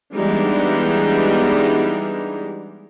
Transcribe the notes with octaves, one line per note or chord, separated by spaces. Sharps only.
E3 G3 G#3 B3 D4 D#4